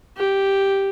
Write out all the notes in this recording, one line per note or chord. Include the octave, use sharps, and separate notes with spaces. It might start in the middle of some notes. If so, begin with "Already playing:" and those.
G4